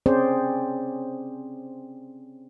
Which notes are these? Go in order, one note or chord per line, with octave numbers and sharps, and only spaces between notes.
C4 C#4 G#4 C5 D5